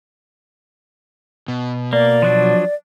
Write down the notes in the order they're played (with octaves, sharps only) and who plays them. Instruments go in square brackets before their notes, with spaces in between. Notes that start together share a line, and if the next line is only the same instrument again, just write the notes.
[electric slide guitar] B2
[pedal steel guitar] A#3 [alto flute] D5
[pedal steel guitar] F3 F#3 D4